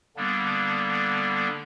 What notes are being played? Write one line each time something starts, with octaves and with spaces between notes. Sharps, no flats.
D3 G3 A#3 B3 D4